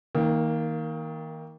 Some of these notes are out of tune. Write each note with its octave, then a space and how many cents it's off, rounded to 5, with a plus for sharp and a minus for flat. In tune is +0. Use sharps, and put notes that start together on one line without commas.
D#3 +30 A#3 +0